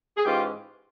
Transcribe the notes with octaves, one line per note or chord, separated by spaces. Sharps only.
G#4
G#2 E3 G#3 C#4 F4 G4